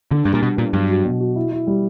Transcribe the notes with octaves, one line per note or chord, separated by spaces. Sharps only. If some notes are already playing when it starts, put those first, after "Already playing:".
D3 D4
G2 G3
A#2
B2 B3
A#2 D4
G2 F#3
F#4
B2
F#4
E4
E4
G3